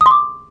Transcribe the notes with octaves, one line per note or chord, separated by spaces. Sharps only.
D#6
C6
D6